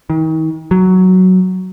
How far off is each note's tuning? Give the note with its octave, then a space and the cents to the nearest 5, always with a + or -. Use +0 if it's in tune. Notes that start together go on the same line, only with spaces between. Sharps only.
D#3 +40
F#3 +5